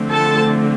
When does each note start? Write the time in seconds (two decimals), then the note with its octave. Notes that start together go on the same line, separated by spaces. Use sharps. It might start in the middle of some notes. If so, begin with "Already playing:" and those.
Already playing: D3 F3 A3 C4
0.11 A4 A5